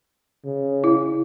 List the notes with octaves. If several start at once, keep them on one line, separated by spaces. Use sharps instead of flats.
C#3
E4